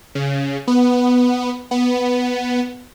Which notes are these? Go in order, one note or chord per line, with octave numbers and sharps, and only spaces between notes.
C#3
B3
B3